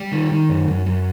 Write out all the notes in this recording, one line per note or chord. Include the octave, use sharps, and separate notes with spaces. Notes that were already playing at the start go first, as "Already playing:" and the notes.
Already playing: G3
D#3
D#3
F#2
F#2
F#2